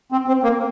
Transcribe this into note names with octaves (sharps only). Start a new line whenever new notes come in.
C4
C4
A#3